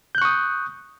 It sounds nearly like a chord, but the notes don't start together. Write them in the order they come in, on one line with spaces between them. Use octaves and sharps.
G6 F#6 C#6 D#6